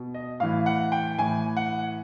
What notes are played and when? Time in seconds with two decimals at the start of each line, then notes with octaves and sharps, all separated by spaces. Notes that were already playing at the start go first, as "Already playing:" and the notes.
Already playing: B2
0.14 D#5
0.40 A2 E3 F5
0.66 F#5
0.92 G5
1.18 A2 E3 G#5
1.57 F#5